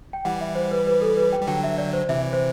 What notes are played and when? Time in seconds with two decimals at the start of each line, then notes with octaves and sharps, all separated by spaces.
0.13 G5
0.25 E3 G3 F#5
0.41 E5
0.55 C5
0.71 B4
0.87 B4
1.01 A4
1.17 B4
1.33 G5
1.42 G3
1.47 D3 F#3 G5
1.64 E5
1.78 D5
1.93 C5
2.09 C3 E3 E5
2.33 C5